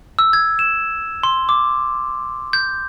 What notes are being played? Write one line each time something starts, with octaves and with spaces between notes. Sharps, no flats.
E6
G#6
E7
C6
D6
G6